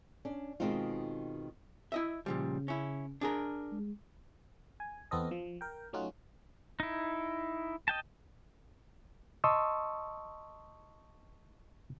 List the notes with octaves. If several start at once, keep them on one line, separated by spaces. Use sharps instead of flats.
C#4 D4
B2 D#3 G#3 C4 D#4 F4
E4 D#5 E5
A#2 C#3 F3 G3
C#4 E4
D4 G#4 A#4
G#3
G#5
E2 B3 C4 A4 D#5
F3
A#4 G5
F#3 A3 C#4 D#4 F4 F#4
D#4 E4
D#5 G5 A5
D#5 A5 C6 C#6 D#6 E6